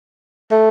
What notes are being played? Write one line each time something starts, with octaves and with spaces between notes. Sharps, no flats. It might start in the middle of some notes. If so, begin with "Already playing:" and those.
A3